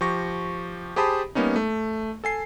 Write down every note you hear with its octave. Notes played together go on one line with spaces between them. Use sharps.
F3 G4 C#6 A#6
G4 G#4 C5 A5 B5 D#6
G3 A#3 B3 C#4 D#4
A3
A4 G#5 C7